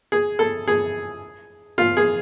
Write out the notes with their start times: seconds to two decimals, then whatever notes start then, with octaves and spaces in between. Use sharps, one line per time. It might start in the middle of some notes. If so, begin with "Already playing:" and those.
0.12 G#4
0.39 A4
0.68 G#4
1.78 F4
1.97 G#4